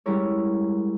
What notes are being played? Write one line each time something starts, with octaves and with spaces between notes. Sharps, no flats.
G3 G#3 C#4 E4 A#4 C#5